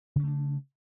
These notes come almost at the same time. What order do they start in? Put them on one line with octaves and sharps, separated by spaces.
C#3 C#4 A3 D4